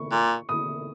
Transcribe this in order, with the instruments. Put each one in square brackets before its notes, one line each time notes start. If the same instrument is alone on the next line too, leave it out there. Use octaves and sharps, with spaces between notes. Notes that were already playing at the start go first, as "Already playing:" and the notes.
Already playing: [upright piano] C#6
[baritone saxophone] A#2
[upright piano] D#6